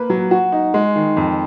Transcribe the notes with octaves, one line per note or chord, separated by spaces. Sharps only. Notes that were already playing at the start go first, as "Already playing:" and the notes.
Already playing: A#3 B4
F#3
F#4
D#4
G#3
D#3
F2